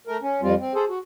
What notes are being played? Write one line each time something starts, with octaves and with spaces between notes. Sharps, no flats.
A3 A#4
C#4
F2 G3 C4 F4
C4
G#4 A4 C5
F#4